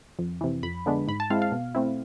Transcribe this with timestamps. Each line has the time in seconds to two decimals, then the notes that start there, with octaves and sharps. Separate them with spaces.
0.19 F2
0.41 C3 E3
0.63 F2 B5
0.86 D3 G#3 B3 D4
1.08 G#2 B5
1.20 A5
1.30 G#3 C4 E4 F5
1.42 F5
1.52 B2
1.75 A3 C4 E4